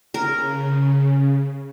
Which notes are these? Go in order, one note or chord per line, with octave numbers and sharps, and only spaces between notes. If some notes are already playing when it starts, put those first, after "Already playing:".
C#3 A#4